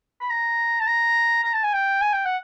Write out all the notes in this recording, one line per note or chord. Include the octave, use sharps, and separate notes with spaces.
B5
A#5
A5
A#5
A#5
A5
G#5
G5
G#5
G5
F#5